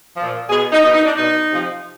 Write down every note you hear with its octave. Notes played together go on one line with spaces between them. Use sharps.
A#2 F3
B2 G#4
D#4
B2 D#4
D#4
D4
B2 D#4
C3 F3